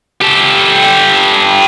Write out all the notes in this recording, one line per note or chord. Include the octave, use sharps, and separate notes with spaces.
G4 A4